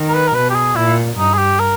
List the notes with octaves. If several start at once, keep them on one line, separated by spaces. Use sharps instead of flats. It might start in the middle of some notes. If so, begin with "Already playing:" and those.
Already playing: D#3
A#4
B4
A#4
B2 B4
G4
G#4
A#2 E4
G2 D#4
G#4
G4
A#4